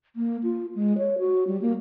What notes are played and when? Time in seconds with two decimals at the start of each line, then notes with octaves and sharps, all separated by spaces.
0.16 A#3
0.43 F4
0.75 G#3
0.98 C#5
1.19 F#4
1.47 G3
1.62 A#3